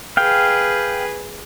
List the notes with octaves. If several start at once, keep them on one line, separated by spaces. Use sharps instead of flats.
G#4 B4 F5 G5